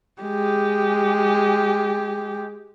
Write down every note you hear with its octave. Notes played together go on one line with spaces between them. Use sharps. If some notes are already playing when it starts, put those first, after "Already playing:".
G#3 G4